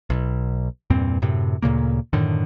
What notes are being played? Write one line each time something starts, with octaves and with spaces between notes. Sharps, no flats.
B1
E2 G2 A#2 C4
F#2 A2 C3
D2 A#2 C#3 A#3
F#2 A2 D3 D#3